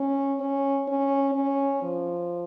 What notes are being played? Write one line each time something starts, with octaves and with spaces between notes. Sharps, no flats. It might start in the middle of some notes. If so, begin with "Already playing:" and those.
Already playing: C#4
C#4
C#4
C#4
F3